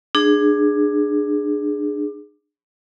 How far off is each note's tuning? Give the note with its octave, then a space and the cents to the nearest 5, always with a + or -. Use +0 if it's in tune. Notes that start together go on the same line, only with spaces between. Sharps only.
D4 +20 G#4 +0